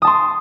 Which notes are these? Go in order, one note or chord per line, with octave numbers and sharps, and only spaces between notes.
A5 C6 D#6